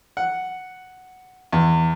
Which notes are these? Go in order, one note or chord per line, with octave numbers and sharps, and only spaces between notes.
F#5
E2